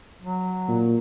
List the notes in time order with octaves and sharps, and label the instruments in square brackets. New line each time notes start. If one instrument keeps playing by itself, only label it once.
[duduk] F#3
[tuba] A#2